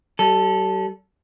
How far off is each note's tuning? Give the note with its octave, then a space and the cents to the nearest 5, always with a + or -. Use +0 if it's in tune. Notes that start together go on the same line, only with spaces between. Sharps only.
G3 -40 A4 +0